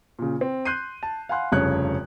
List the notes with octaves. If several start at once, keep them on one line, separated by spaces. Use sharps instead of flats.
A#2 C#3
C4
C6 F#6 G6 C7 D#7
A5
F5 F#5 G#5 B5 C6 F#6
F1 G2 C#3 C#5 F#6